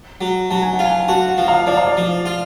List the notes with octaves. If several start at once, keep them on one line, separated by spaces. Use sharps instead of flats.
F#3
F#3 A5
G#5
F#5
F4
G#5
F#4 A5
F#5
F3
F5
F3 D5
F5
D5
F3
F4